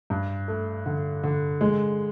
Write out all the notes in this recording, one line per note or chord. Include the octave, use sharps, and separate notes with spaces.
G2
A3
D3
D3
G#3